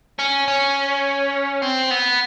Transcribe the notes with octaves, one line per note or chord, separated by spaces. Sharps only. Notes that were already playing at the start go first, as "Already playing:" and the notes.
C#4
C#4
C4
B3